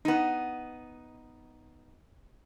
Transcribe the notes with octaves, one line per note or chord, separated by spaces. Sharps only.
B3 D#4